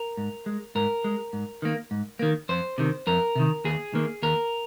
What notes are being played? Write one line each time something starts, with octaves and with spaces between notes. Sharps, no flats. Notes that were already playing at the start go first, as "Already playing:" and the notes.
Already playing: A#4
G#2
G#3
G#2 A#4
G#3
G#2
D#3 A#3
G#2
D#3 A#3
F2 C5
C3 D#3
F2 A#4
C3 D#3
D#2 G#4
D#3 A#3
D#2 A#4